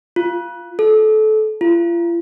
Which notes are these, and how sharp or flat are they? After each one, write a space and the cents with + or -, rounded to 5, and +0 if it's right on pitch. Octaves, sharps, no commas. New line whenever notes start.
F4 -10
A4 -25
F4 -40